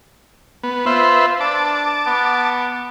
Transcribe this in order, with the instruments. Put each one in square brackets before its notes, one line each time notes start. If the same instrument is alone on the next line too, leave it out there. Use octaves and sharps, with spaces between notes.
[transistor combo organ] B3
[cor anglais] F4 [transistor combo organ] B4 C5 E5
[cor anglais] D4 [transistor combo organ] A5 D6
[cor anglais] B3